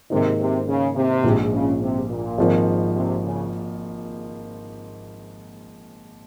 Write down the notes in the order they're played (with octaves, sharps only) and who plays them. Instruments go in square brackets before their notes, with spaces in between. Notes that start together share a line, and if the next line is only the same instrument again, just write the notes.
[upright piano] G#2 D#3 A#3 D#4 [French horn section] C3
[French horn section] C3
C#3
C3
[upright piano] A#1 G#2 F3
[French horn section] C#3
C3
A#2
[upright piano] G#1 G#2 F3 A#3
[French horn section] C3
C#3